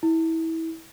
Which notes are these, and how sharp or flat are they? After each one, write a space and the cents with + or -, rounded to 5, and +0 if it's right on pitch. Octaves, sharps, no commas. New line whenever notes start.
E4 -25